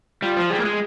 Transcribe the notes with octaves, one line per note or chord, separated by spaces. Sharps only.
G3 F4
F3
G3 G#4
A#3
G#3